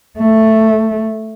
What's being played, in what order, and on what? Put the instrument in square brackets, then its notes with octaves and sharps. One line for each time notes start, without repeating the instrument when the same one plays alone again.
[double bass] A3